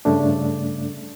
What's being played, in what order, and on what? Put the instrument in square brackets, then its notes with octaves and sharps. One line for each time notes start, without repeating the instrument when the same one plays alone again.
[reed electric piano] G2 C#3 A3 D4